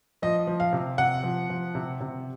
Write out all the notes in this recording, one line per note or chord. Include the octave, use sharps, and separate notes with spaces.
F3 D#5
F3
F5
C3
C3 F#5
F3
F3
C3
C3